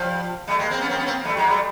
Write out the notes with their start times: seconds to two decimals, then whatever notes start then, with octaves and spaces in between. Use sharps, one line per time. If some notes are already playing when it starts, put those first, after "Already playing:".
Already playing: F3 G3
0.47 G3 A3
0.59 G#3 A#3
0.70 A#3 C4
0.81 B3 C#4
0.89 A#3 C4
0.97 B3 C#4
1.05 A#3 C4
1.21 A#3
1.25 G3 A3
1.37 F#3 G#3
1.47 G3 A3